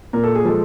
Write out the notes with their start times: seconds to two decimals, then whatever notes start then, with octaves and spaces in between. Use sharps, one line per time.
0.13 A#2 A#4
0.24 A4
0.35 G#4
0.45 F3 G#3 A4